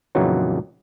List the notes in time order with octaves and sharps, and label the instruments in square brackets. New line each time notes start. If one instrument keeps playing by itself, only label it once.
[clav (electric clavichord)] F2 A#2 C#3 E3 F#3 D#4